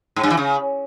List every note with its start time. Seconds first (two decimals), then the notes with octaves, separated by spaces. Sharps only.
0.16 G#2
0.23 G2
0.30 E3
0.37 C#3